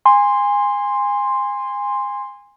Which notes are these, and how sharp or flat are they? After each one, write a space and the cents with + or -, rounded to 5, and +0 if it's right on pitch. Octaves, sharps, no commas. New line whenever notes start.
G#5 -25 C6 +0